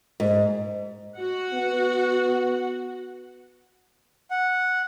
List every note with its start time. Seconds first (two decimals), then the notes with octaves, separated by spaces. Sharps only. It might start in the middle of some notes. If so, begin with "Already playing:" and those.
0.20 G#2
1.18 F#4 F#5
1.53 B3
4.31 F#5